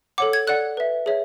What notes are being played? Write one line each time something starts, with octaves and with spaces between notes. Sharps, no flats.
A4 C#5 F#5 D6
G#6
A4 D5 F#5 F#6
B4 E5
G#4 C#5 E5